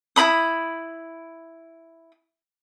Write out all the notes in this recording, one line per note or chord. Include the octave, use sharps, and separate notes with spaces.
E4 A#4 B5 D#6